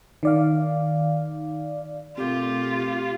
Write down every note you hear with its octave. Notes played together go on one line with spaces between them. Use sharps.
D#3 D5 F5
B2 A3 C4 F4 G4 A#4